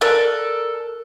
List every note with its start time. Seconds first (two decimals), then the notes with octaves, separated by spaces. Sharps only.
0.01 A4 A#4 D5 F#6